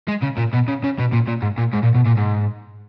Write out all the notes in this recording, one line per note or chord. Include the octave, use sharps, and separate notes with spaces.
G#3
C#3
A#2
B2
C#3
C#3
B2
A#2
A#2
G#2
A#2
G#2
A#2
B2
A#2
G#2